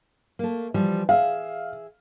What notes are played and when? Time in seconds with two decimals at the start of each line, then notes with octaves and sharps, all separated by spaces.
0.39 A3 A#3
0.74 E3 F3 G3
1.09 G#4 E5 F5